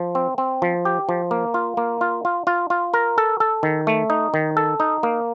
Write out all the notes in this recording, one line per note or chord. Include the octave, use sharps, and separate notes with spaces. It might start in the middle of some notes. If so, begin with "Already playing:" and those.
Already playing: F3
C4
C4
F3
G4
F3
A#3
F4
A#3
F4
F4
F4
F4
A#4
A4
A4
D#3
A3
D#4
D#3
A4
D#4
A#3